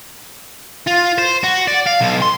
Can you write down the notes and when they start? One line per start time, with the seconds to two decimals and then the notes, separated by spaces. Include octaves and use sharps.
0.87 F4
1.18 C5
1.44 F#4
1.68 D5
1.87 F5
2.02 B1
2.22 C6